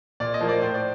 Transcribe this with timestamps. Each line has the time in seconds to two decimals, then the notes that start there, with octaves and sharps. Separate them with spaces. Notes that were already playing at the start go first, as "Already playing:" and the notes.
0.20 A#2 D5
0.34 D#5
0.41 F3 A#3
0.48 D5
0.62 A2 C5
0.74 D5